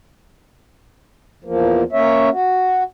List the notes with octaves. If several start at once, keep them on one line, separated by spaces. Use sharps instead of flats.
E2 F3 A#3
A#3 C#4 C#5 E5
F#4